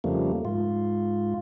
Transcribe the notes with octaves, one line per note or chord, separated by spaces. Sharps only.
F2 C#3 F3 G3 A3 A#3
G#2 F4